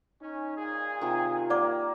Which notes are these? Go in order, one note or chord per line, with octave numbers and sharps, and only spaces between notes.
C#4 D#4
A#2 G#4
C3 D#3 F4
A#3 D5 F#5 D6